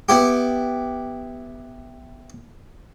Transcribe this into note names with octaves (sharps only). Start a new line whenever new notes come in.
B3 E4 G4